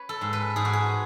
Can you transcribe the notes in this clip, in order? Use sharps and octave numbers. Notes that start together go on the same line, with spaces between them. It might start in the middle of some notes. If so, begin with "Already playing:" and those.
Already playing: B4 C#5
A4
G#2
B4
G#2 G#4
F#4
G#4